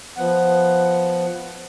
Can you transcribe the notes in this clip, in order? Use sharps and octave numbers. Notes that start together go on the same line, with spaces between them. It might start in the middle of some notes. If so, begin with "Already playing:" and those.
F3 B3 F#5